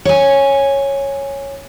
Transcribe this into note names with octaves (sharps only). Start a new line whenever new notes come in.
C#5 G#5